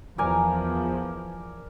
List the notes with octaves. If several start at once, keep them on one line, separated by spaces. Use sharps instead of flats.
E2 F3 A#4 D5 G#5